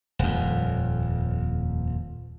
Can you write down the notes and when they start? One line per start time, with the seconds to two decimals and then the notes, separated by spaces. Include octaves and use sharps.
0.19 D#1 F2